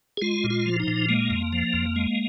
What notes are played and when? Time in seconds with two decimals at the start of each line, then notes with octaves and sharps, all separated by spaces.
0.17 G#4
0.22 G#3 F4
0.44 A#2
0.50 F4
0.66 F3
0.80 D#4
0.87 A#2
1.09 G#3 A#3
1.30 F2
1.53 F3
1.74 F2
1.96 G#3